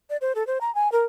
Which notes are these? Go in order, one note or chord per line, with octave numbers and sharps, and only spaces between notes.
D5
C5
A4
C5
A#5
G#5
A#4